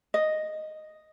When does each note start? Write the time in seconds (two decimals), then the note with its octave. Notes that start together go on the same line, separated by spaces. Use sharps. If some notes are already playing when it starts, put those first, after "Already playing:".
0.14 D#5